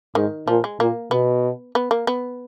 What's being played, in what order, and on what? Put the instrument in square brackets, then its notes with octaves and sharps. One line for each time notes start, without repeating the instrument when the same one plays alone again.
[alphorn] G#2 [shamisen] D#3
[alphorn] A#2 [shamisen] F3
[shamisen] G#3
[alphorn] A#2 [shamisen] A#3
[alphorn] B2 [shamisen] B3
[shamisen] B3
A#3
B3